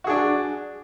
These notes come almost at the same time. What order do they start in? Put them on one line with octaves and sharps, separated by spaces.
F#4 G#4 D4